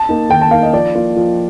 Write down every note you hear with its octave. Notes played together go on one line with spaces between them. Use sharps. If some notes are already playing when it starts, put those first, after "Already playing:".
Already playing: A5
A#3 D#4
D#3 G5
A5
A#3 D#4 F5
D#5
F3 D5
A#3 F4
F3